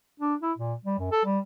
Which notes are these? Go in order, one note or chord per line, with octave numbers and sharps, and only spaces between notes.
D4
E4
A#2
G3
F#2
A4
G3